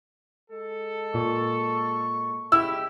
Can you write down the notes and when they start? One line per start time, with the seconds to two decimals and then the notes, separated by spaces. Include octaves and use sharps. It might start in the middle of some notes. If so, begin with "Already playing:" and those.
0.51 G#3 A4
1.14 A#2 C#6
2.52 C#3 G#3 E4 G4 E6